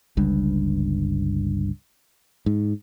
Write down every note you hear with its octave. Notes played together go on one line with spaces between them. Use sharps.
G1 C#2 G2
G#2